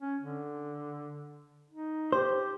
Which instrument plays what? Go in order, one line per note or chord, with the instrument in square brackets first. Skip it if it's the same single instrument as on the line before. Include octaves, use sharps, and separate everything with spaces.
[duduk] C#4
D3
D#4
[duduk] G4 [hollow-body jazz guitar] C5